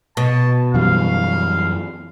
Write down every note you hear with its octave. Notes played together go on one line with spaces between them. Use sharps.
B2 A5
F#2 E3 G3 F5